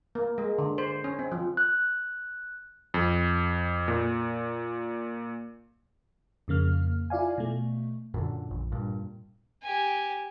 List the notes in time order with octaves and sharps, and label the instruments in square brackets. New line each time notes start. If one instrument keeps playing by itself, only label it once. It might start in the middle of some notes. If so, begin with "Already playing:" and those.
[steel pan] A#3
G#3
D3
C5
C#4
C4
F3
[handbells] F#6
[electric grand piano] F2
A#2
[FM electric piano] F2 C#3 A#3 F6
E4 F4 D5 F5 G#5
B2 A3
[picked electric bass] F#2 A#2 D3
A#1
G2 A#2
[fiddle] G4 G#5